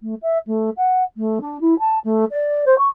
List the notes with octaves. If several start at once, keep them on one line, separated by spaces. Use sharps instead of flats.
A3
E5
A3
F#5
A3
D4
E4
A5
A3
D5
C5
C#6